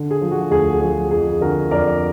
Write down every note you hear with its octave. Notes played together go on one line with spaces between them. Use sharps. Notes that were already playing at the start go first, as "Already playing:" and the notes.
Already playing: D3
G#4
F3
F#4
D2 G#4
F3 G#4
F2 G#4
D3 F#4 A#4
F2 A#4 D5